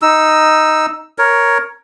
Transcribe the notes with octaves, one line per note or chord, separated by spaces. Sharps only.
D#4 E6
A#4 C#5